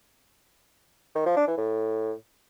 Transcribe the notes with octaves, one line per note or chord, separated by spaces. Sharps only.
D#3
F3
D4
E3
A2